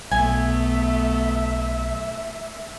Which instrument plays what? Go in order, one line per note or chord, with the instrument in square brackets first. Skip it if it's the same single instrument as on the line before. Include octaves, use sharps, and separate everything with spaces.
[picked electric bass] B1 [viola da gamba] A3 B3 [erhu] E5 [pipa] G#5